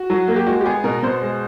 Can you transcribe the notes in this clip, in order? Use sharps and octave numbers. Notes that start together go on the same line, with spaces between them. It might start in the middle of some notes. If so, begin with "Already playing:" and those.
Already playing: F#4
F#3
A#3
G4
G#3 F#4
G4
B3 G#4
B2 A#4
B2 C5
G#3